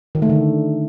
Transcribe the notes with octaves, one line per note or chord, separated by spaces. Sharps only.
D#3
A3
D3